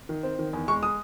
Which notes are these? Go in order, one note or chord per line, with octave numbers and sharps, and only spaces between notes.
D#3
C4
D#3
E2
G#3 C#6
D#6